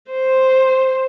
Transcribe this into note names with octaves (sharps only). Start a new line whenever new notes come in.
C5